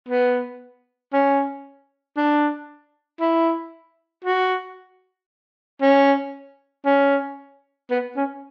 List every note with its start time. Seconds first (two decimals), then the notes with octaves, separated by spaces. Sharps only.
0.09 B3
1.13 C#4
2.17 D4
3.20 E4
4.25 F#4
5.82 C#4
6.86 C#4
7.90 B3
8.16 C#4